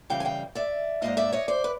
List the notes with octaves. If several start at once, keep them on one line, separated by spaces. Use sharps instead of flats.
C#3 E3 G3 F5 G5
G#5
F5 G5
D5 E5
G#2 F3 A#3 D#5 F5
D5 E5
C#5 D#5
C5 D5
B4